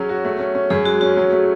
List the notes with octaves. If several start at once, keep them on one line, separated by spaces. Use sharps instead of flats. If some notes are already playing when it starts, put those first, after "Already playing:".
Already playing: F#3 C#4 G#4
F#4
A3
C#4
C#4
F#2 G#4
G#3 F#4
C#4 F#4
F#3
A3